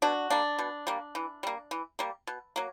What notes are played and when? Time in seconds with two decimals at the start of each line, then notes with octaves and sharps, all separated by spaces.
0.02 B2 D4 F#4
0.30 G3 A#3 D4
0.59 B2
0.87 G3 A#3
1.15 E3
1.43 G3 A#3
1.71 E3
1.99 G3 A#3
2.27 B2
2.56 F#3 A#3